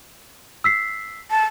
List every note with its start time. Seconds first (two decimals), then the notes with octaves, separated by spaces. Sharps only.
0.64 E6 B6 C7
1.31 A5